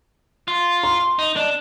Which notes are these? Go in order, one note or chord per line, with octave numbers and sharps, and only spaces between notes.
F4
C6
D#4
D4